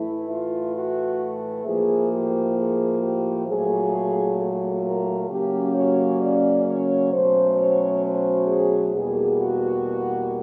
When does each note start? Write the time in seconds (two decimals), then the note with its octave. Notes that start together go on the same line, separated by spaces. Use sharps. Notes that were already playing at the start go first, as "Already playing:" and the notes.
Already playing: A2 E3 A3 E4
0.29 F4
0.74 F#4
1.65 A2 F3 A#3 G#4
2.11 G4
2.56 G#4
3.02 G4
3.47 A#2 F#3 A3 G#4
4.38 A4
4.84 A#4
5.29 C#3 F#3 A#3 C#4 G4
5.75 C#5
6.20 D5
6.66 C#5
7.11 B2 F#3 A3 C#4 C5
7.58 C#5
8.03 C5
8.48 G#4
8.94 E2 B2 G3 A#3 G#4
9.40 F#4